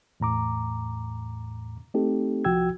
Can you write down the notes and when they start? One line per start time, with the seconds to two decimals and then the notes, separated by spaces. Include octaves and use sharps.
0.20 E2 A2 A#5 D6
1.94 A3 C4 D#4 G4 A4
2.45 C2 F3 F#4 G5 E6 G#6